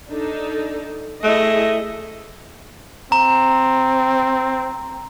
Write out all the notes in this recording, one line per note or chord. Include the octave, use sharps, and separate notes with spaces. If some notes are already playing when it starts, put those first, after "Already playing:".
D4 D#4 A4
A3 E4 G#4 D#5
C4 A#5